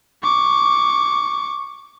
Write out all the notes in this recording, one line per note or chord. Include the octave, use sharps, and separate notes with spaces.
C#6 D6